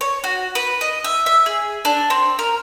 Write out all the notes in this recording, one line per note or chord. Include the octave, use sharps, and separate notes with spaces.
C#5
F#4
B4
D#5
E5
E5
G#4
D4
C4
A#4